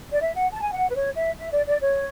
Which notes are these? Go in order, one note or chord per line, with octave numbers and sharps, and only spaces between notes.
D5
E5
F#5
A5
G#5
F#5
B4
C#5
E5
E5
D5
D5
C#5